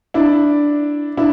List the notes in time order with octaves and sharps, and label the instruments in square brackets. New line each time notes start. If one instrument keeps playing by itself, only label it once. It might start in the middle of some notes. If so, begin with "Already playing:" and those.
[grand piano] D4 E4
D4 E4